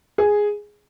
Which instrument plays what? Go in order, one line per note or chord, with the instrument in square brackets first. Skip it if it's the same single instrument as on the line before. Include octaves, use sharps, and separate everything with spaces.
[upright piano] G#4